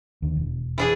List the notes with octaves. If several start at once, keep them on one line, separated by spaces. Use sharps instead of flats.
D#2 D3
E1
E3 D4 G#4